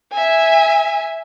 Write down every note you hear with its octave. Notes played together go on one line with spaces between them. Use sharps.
E5 G#5